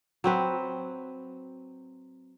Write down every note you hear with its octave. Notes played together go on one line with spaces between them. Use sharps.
F#3 C4 B4